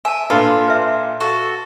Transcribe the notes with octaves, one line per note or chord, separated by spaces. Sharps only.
E5 G#5 A5
A#2 D4 F4 A4 B4 B5 C6
B4 E5
F#4 A4